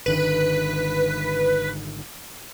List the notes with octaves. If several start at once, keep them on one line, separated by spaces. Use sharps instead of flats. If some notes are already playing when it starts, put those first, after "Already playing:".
G#1 D3 D#3 B4